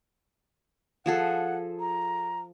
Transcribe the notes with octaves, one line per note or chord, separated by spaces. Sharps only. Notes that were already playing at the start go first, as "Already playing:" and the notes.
F3 G#4 A4 F#5
A#5